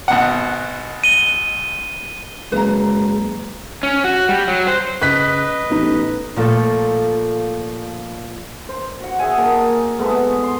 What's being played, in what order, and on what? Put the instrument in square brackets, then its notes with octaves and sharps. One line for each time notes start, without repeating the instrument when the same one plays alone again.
[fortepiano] G#1 B2 F#5
[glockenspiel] D#7 G7
[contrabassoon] F#1 [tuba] G#3 [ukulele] B4 A#5
[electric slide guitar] C#4
F#4
G3
F#3
C5
[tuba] C#3 [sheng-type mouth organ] B4 D#5 [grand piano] F#6 B6
[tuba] A1 [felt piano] B3 D#4
[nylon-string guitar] A#2 F3 A3 A4
[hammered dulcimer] C5
F#4 F#5
G#4 E5 G#5
A#3 D#4 G#4 A5
G#3 A3 B3 E4
C6